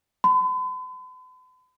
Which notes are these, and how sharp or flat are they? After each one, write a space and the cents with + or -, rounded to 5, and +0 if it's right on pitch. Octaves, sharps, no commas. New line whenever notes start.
B5 +45